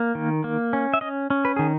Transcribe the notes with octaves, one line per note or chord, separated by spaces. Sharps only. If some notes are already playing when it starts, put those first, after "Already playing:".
Already playing: A#3
D#3
A#3
C#4
E5
C#4 D#5
C#4
B4
D#3 G#4